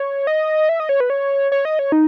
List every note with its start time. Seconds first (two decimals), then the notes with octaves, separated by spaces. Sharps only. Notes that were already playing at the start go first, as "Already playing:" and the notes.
Already playing: C#5
0.27 D#5
0.69 E5
0.80 D#5
0.89 C#5
1.00 B4
1.10 C#5
1.52 C#5
1.65 D#5
1.79 C#5
1.92 D#4